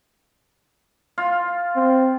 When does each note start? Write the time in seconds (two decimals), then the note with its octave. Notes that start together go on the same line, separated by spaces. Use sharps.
1.18 F4
1.76 C4